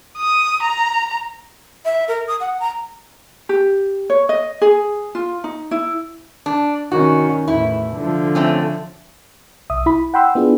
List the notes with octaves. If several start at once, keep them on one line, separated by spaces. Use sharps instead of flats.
D#6
A#5
E5
A#4
D#6
F#5
A#5
G4
C#5
D#5
G#4
F4
D#4
E4
D4
D#3 C#4 F#4
E2 A2 E4
D3 F3
A3 C4 C#4
B1 E5 D#6
E4 B5
F#5 G5 B5 C6 E6
B3 D4 E4 F4 G#4